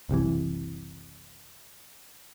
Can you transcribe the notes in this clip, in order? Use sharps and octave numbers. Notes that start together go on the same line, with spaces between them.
F#1 C2 C3 E3